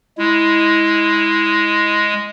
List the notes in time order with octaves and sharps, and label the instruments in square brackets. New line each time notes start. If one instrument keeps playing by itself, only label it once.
[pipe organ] G#3 [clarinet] E4